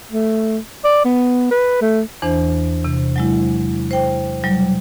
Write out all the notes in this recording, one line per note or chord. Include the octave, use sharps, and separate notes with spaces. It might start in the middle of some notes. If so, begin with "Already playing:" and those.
A3
D5
B3
B4
A3
E2 E3 D4 C5
C3
F#3 G#3 E4
C5 G5
B2 F#3 G3